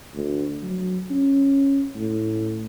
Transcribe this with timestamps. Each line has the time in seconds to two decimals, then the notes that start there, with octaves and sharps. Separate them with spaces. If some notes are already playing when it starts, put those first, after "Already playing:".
0.14 D2
0.63 F#3
1.10 C#4
1.96 A2